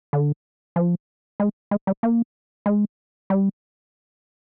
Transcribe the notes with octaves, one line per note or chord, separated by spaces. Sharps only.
D3
F3
G#3
G#3
G3
A#3
G#3
G3